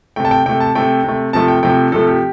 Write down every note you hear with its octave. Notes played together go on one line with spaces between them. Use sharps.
C3 A3 G5
A5
G5
C3 A3 G5
A5
C3 A3 G5
C3 A3
C3 F3 A3 A5
G5
C3 F3 A3 G5
C3 F3 A3 A4
G4